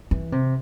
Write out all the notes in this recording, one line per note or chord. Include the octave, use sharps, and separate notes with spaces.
E3
C3